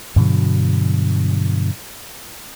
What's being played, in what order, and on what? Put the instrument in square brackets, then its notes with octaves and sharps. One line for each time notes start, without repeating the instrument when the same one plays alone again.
[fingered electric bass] G2 B2 D3 F#3